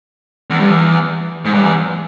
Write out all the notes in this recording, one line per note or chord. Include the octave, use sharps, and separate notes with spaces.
E2
G2
E2
G#2
G2
E2